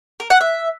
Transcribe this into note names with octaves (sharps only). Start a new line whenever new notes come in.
A#4
F#5
E5